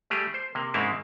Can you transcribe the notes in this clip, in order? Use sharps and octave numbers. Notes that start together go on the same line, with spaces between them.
G3 A3 G4 G#4
C5
C3 A#3
G#2 C#3 G#3 A#3 C4 E4